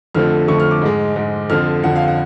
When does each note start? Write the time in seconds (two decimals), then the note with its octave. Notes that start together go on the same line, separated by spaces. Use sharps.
0.15 F2 D3 F3 A3 F6
0.48 F2 D3 F3 A3 C#6
0.60 F6
0.71 D6
0.81 G#2 G#3
1.16 G#2 G#3
1.49 F2 D3 F3 F6
1.84 F2 D3 F3 F#5
1.96 F5
2.08 F#5